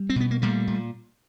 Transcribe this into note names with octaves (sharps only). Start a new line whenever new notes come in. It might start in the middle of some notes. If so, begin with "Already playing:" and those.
Already playing: G3
C4
B2 B3
A#3
A#2 G3 A3
A#2